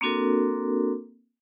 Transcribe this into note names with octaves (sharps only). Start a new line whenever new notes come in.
A#3 C4 D4 F#4 A4 A#4